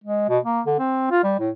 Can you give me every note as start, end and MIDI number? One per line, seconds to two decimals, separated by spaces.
0.04 0.27 56
0.29 0.39 47
0.45 0.61 58
0.66 0.76 50
0.79 1.10 60
1.11 1.23 65
1.23 1.37 55
1.39 1.50 45